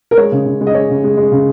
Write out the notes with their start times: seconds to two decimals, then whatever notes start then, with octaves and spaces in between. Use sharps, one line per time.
0.11 A#4
0.17 G#3 C#5
0.32 C#3
0.46 C#3
0.61 G#3
0.67 D#5
0.74 G#3 C#5
0.89 C#3
1.04 G#3
1.17 G#3
1.32 C#3